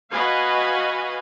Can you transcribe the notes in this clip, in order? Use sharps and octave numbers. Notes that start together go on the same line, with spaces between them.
F#4 B4 D#5 F5 G#5